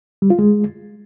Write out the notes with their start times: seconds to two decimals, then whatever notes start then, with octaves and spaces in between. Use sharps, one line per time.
0.22 G3
0.30 F4
0.39 G#3